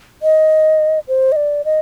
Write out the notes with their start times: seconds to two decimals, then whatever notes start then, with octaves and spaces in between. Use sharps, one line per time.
0.22 D#5
1.08 C5
1.32 D#5
1.36 D5
1.65 D#5